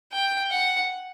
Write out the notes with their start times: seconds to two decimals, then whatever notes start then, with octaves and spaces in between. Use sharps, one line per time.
0.12 G5
0.51 F#5